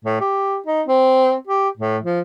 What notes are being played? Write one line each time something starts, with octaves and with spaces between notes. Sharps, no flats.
A2
G4
D#4
C4
G4
A2
F3